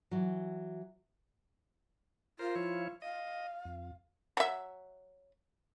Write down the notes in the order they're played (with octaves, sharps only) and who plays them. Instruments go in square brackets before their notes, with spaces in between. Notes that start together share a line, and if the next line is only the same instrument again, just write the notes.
[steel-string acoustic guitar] E3 F#3
[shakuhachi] F4 [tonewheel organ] A#4 C5
[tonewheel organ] F3 E4 C#5
[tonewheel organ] D#5 [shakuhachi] F5
[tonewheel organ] F2
[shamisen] F#3 E5